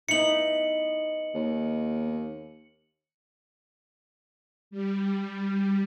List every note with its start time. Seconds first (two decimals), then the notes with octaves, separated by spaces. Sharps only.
0.09 B3 D#4 E4 C#7 F#7
1.35 D#2
4.71 G3